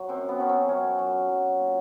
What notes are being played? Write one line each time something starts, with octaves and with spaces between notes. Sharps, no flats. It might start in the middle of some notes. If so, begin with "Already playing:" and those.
Already playing: F#3
F#2 C4
B3
F#3 C#4
C4
F#2 C#4
F#3
F#3
A#2